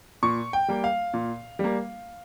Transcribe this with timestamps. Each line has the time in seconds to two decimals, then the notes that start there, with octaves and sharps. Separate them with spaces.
0.23 A#2 C#6
0.53 G5
0.68 G3 A#3
0.84 F5
1.14 A#2
1.59 G3 A#3